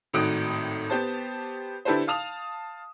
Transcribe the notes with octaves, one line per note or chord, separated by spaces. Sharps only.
G#1 A2 D#3 F#4 D#6 D7
B3 G4 C5 A5
D3 E4 G4 A4 B4 C5
F5 A5 D#6 F7